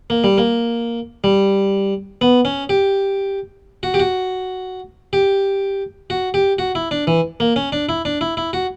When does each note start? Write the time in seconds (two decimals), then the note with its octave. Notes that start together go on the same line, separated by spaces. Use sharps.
0.10 A#3
0.24 G3
0.38 A#3
1.24 G3
2.21 B3
2.45 C#4
2.69 G4
3.83 F#4
3.94 G4
4.00 F#4
5.13 G4
6.10 F#4
6.34 G4
6.58 F#4
6.75 E4
6.91 D4
7.07 E3
7.40 A#3
7.56 C#4
7.72 D4
7.89 E4
8.05 D4
8.21 E4
8.37 E4
8.53 F#4